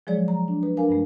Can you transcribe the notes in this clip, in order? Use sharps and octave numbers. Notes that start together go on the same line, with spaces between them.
F3 F#3 G#3 G#4 C#5 D5
A#5
D4
B4
D4 A#4 F5 G#5
G2 A3